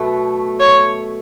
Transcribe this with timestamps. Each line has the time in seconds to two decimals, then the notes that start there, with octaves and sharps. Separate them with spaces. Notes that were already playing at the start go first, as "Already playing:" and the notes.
Already playing: B2 F#3 A3
0.60 C#5